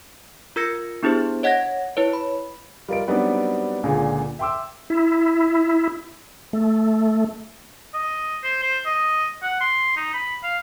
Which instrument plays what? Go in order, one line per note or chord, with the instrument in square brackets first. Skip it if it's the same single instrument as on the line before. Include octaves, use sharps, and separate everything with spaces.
[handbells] F4 A#4 E6 G#6 A#6 C#7
B3 D4 E4 G4 G#4 C5
C#5 D#5 F#5 F#6 G#6 A#6
E4 B4 C#5
B5
[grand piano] G3 F4 A#4 D#5 D7
F#3 G3 B3 C4 D4 D#4
C#2 A#2 D3 G#4
E5 G5 C6 D6 E6
[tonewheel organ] E4
A3
[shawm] D#5
C5
C5
D#5
F#5
C6
D#4
B5
F5